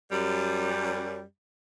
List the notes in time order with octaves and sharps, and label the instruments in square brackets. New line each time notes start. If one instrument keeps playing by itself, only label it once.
[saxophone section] F#2 G3